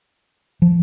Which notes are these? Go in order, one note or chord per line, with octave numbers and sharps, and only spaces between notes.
F3